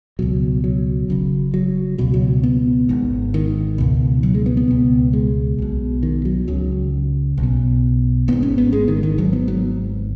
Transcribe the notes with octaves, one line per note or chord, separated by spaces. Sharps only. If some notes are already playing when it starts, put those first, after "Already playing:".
C#2 B2 F#3
F#3
F#1 F#2 C#3
F#3
C#2 B2 F#3
F#3
B3
G#1 G#2
D#3
C#2 B2
F#3
G#3
B3
B3
C#2 B2
G#3
B1 B2
D#3
F#3
C#2 C#3 F#3
B1
B2
G#1 G#2 B3
C#4
B3
G#3
D#3
D#3
G#1 G#2 F#3
B3
F#3